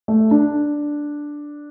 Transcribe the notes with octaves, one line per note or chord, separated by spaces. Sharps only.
A3
D4